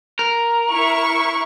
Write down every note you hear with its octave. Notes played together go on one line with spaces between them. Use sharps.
A#4
E4 C#6